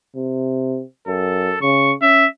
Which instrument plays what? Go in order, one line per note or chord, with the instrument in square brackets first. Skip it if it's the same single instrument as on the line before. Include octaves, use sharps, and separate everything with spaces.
[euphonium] C3
[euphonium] F#2 [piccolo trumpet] A4
[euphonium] C#3 [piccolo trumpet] C#6
[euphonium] C#4 [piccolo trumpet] E5